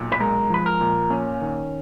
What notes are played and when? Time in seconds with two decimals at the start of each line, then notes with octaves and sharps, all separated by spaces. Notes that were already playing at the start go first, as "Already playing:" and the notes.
Already playing: B1 A#2
0.12 B4
0.20 G#3 A#4
0.50 F3 B4
0.66 A#4
0.81 A#2
1.10 A#3 C#4
1.41 D#3